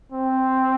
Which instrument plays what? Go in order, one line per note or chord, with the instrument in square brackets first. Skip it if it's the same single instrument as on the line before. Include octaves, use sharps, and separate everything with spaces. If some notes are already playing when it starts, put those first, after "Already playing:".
[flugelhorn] C4